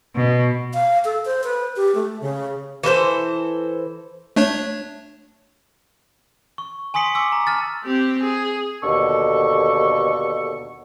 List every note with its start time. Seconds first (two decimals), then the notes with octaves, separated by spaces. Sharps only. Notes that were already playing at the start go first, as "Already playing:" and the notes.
0.15 B2
0.73 F5
1.05 A4
1.25 C5
1.44 B4
1.76 G4
1.95 A3
2.21 C#3
2.83 E3 A4 A#4 C5
4.36 A3 D4 C#5
6.58 C#6
6.94 G#5 C6 D#6 B6 C#7 F#7
7.15 G#5 D6 E6
7.32 A#5
7.47 A5 F6 A6
7.84 C4 G4
8.22 G#4
8.83 D#2 B2 D3 A4 C#6